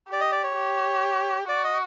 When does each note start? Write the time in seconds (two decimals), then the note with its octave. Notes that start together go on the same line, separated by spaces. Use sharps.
0.09 G4 D5
0.21 D#5
0.32 D5
0.43 C#5
0.55 G4
1.48 F#4 D5
1.64 D#5